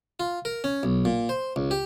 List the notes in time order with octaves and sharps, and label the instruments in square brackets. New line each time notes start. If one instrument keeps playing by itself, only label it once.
[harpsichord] F4
A#4
C#4
B1
A#2
C5
C#2
G4